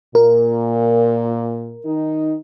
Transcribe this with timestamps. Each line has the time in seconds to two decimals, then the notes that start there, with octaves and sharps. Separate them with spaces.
0.15 A#2 A#4
1.85 D#3 D#4